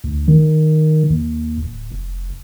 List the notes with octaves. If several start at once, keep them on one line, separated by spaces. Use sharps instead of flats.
D2
D#3
D#2
D1
F1